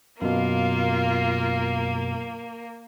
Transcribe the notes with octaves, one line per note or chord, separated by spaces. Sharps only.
F#2 B2 A#3 F4